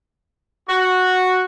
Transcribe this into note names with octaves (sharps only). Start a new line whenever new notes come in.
F#4